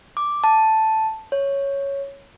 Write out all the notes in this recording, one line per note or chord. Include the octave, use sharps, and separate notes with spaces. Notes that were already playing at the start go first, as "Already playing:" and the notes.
D6
A5
C#5